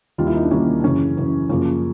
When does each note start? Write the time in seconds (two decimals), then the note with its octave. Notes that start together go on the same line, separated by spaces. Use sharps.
0.18 D#2 D#3 G3 A#3 F4
0.27 E4
0.34 D#4
0.43 D4
0.51 D#2 D#3 G3 A#3 C#4
0.80 D4
0.84 F#2 C#3 E3 C#4
1.17 F#2 C#3 E3
1.49 F#2 C#3 F3 A#3 C#4